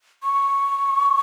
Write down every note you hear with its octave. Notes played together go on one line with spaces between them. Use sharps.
C#6